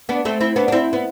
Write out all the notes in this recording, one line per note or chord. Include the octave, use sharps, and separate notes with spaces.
B3 D4
A3 C4
C4 E4
B3 D4
D4
C4 E4
B3